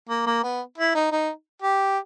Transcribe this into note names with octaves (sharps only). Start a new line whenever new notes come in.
A#3
A#3
B3
E4
D#4
D#4
G4